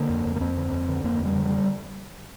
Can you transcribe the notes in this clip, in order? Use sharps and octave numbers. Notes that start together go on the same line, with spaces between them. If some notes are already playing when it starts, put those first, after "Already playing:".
Already playing: D3 A#3
F2
F2
A#3
F2 C4
D3
F2
D3
F2 A#3
F2
G3
D3
G3
D3